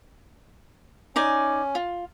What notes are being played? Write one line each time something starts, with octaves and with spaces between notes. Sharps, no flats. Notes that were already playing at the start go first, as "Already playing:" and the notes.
C#4 D#4 D5 G#5
F4